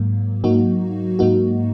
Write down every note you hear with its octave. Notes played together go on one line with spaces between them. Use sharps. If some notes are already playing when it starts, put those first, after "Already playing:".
Already playing: G#2 F#3 A#3
G#2 F#3 A#3 D#4 F#4
G#2 F#3 A#3 D#4 F#4